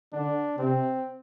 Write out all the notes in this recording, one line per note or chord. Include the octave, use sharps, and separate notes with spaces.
D3 D4
C3 C4